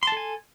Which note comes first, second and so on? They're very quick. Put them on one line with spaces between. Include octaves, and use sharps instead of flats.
C6 A5 A4 G#5